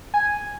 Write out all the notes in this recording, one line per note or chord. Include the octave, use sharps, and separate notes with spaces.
G#5